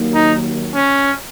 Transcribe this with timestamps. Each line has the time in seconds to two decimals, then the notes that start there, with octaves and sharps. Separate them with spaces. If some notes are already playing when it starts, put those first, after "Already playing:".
Already playing: D#2 D#3 F#3 A#3
0.15 D#4
0.75 C#4